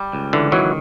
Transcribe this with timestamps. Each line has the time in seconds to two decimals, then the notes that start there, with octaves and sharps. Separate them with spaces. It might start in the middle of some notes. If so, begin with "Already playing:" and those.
Already playing: G3
0.13 C#2
0.33 D3 E3
0.52 D#3 E3 F#3